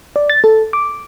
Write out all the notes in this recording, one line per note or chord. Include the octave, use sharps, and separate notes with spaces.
D5
A6
A4
D6